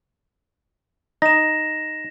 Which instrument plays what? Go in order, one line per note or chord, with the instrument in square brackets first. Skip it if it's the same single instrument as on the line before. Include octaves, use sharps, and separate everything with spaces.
[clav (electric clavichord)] D#4 [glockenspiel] A#6 E7